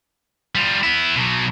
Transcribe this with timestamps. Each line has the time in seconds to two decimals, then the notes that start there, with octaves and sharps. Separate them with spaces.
0.55 G3 F4
0.83 B3 E4
1.15 B2 F#3